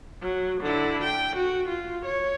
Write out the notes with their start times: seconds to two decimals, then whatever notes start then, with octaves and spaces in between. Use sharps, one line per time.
0.21 F#3
0.61 D3 E4
1.04 G5
1.36 F#4
1.68 F4
2.05 C#5